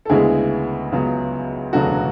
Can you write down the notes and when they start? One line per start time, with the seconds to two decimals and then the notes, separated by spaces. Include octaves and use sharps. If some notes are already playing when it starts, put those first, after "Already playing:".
0.05 A4
0.09 D2 C#3 G#3 B3 E4 G#4
0.92 C#2 C#3 F#3 B3
1.73 E1 D2 C#3 F#3 B3 F#4 A4